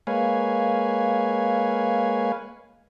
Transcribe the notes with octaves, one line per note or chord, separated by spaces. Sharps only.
G#3 A#3 B4 C#5 F5 G#5